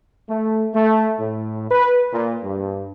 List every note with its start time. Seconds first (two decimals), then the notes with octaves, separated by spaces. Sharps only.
0.28 A3
0.74 A3
1.19 A2
1.69 B4
2.13 A#2
2.43 G2